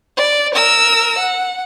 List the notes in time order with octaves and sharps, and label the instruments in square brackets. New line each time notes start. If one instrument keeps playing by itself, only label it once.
[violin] D5
A#4 E6
F#5